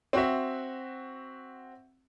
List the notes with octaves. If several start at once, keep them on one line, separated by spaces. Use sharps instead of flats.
C4 F#4 E5